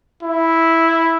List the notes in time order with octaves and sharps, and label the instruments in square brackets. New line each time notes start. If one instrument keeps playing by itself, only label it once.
[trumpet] E4